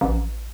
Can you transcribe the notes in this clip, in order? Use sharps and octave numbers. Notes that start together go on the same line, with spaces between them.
A1